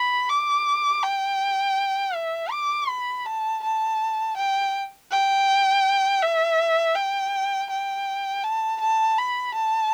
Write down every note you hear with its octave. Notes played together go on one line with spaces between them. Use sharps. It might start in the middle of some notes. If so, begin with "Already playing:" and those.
Already playing: B5
D6
G5
E5
D6
B5
A5
A5
G5
G5
E5
G5
G5
A5
A5
B5
A5